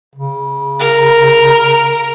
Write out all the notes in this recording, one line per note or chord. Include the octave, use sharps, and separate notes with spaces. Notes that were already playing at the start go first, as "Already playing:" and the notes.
C#3
A#4